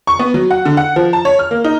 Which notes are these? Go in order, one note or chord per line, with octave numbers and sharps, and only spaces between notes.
C#6
B3
F#3
F#5
D3
F#5
F3
A5
C#5
F6
A#3
D#4